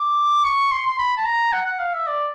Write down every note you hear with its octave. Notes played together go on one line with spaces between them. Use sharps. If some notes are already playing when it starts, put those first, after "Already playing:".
Already playing: D6
C#6
C6
C6
B5
A5
A#5
F#5
F#5
F5
E5
D5